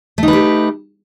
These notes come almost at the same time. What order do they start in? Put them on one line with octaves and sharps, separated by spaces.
A3 D#4 B4 G4